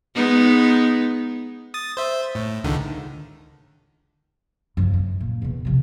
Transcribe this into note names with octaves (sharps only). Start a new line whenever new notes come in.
G#3 B3 D#4
D#6 A6
C5 E5
A2
C#2 D3 D#3
F#2 F3
F#2
A#2
E2 B2
C3 F3